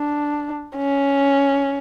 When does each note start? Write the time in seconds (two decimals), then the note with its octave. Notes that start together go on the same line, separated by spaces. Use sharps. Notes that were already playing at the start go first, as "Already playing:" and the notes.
Already playing: D4
0.77 C#4